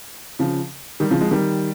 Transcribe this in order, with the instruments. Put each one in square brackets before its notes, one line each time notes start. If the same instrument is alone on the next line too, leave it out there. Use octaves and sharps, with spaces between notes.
[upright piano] C#3 F3
D#3 G3
C#3 F3
F3 G#3
D#3 G3